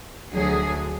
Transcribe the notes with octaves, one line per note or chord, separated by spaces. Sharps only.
D2 D3 F#3 G#4